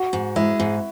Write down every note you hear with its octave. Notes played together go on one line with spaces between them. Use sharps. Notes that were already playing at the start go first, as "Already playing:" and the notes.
Already playing: F#4
G#2
G#3 E4
G#2